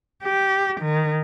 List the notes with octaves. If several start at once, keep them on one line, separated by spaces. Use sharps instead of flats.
G4
D#3